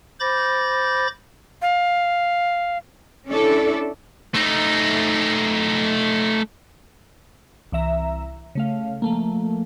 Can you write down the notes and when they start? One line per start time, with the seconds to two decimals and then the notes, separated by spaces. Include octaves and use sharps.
0.20 C5 B5 D6 G6 A6 A#6
1.62 F5
3.27 C#4 D4 E4 A4 D5
4.35 A3 D#4
7.72 C2 E3 E5 A#5
8.55 C#3 A3 F5
9.02 F3 A3 A#3